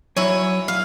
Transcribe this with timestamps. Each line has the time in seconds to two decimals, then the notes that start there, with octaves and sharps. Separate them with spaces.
0.17 F#3 E4 C#5 G#5
0.68 F5